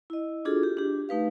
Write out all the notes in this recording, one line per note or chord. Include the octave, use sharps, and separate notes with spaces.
E4 D#5
D4 F4 F#4 G#4 A4
G4
D4 G4
A3 D#4 B4 F5